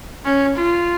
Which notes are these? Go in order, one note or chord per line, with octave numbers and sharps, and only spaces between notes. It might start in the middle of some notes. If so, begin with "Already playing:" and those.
C#4
F4